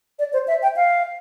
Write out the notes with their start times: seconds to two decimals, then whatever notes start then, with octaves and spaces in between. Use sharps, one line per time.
0.19 D5
0.33 C5
0.48 E5
0.62 G5
0.76 F5